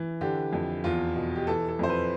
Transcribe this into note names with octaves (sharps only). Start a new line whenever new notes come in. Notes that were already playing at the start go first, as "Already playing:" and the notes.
Already playing: E3
D3 G4
F2
E2 F4
B2
G4
E3 A4
A4
F2 C5
B4